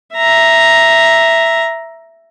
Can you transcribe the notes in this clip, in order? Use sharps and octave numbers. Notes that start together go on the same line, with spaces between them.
E5 A#5